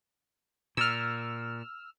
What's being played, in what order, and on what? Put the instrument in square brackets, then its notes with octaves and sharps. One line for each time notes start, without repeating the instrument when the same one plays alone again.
[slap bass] A#2 [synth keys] E6 F6